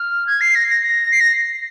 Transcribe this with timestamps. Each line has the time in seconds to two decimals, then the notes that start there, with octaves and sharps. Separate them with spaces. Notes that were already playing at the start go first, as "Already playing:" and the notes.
Already playing: F6
0.27 G#6
0.41 C7
0.55 A#6
0.68 A#6
0.82 A#6
1.11 C7
1.20 A#6